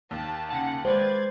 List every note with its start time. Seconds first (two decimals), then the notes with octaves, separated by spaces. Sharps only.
0.11 D#2 A5
0.50 C#3 F#5 A5
0.85 G#3 B4 C5 D5 G#6 A6